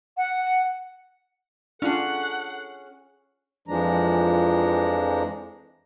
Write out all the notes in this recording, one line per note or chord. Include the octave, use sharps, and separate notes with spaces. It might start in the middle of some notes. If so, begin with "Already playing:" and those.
F#5
C#4 D4 F4 G#4 A4 F#5
F2 E3 F3 G#3 D4 A#5